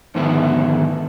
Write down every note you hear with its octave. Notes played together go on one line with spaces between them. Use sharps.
F2 G#2 D3 D#3 B3 E4